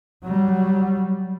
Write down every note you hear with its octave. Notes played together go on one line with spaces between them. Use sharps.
F#3 G3